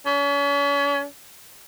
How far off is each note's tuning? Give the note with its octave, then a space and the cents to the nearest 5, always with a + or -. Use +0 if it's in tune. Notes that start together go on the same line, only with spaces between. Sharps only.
C#4 +40